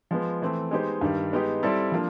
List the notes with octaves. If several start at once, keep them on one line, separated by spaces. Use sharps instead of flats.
F3 G#3 B3
E3 A3 C4
G#3 B3 D#4 G4 C5
G2 D#3 G3
G#3 B3 D#4 G4
G3 C4 E4 A4 D5
F3 A#3 D4 F4